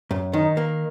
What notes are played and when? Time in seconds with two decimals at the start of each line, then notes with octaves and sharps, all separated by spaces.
0.11 F#2
0.33 D#3 D#4
0.57 A#3